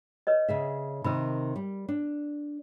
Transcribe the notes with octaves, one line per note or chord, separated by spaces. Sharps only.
B4 C#5 D#5
C#3 G#4 E5
C3 D#3 A#4 D#5 B5
G3
D4